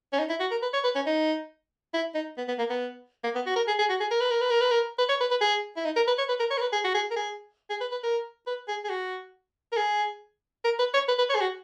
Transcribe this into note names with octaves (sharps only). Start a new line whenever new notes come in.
C#4
D#4
E4
F#4
A#4
B4
C#5
B4
C#4
D#4
E4
D#4
B3
B3
A#3
B3
A#3
B3
F#4
A#4
G#4
G#4
F#4
G#4
A#4
B4
A#4
B4
A#4
B4
A#4
B4
C#5
B4
B4
G#4
E4
D#4
A#4
B4
C#5
B4
A#4
C#5
A#4
B4
G#4
F#4
G#4
A#4
G#4
G#4
B4
B4
A#4
B4
G#4
G#4
F#4
A#4
G#4
A#4
B4
C#5
B4
B4
C#5
G#4
F#4